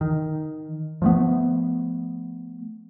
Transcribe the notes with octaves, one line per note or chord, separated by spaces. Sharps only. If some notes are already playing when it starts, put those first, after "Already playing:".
D#3
F3 A3 B3